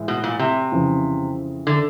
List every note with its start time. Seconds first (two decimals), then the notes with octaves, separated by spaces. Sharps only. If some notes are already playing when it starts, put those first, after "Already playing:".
Already playing: A2 E3 G#3 E4
0.08 B2
0.24 A#2
0.39 C3
0.72 F2 C#3 E3
1.67 D3